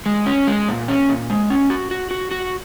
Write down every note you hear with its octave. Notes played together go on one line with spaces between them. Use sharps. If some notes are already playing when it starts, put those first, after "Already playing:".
G#3
C#4
G#3
A#2
C#4
A#2
G#3
C#4
F#4
F#4
F#4
F#4